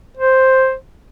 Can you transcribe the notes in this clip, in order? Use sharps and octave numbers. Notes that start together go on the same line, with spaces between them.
C5